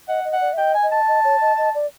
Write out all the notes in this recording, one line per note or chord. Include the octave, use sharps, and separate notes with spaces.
D#5 F#5
D#5
F#5
D5
E5
D#5 G5
G#5
D#5
A5
D#5
C#5
D#5
D#5
D5